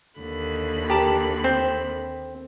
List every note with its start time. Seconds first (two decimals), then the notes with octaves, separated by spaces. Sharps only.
0.20 D#2 D3 B5
0.90 G4 A#4 A5
1.44 C4